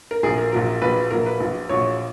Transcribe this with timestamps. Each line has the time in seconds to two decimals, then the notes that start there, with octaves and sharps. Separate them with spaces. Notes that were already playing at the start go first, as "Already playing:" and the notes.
0.11 A#4
0.23 A#1 A#2 F#3 G#4
0.38 A#4
0.52 A#1 A#2 F#3 A#4
0.81 A#1 A#2 F#3 B4
1.11 A#1 A#2 F#3 A#4
1.26 B4
1.40 A#1 A#2 F#3
1.69 A#1 A#2 F#3 C#5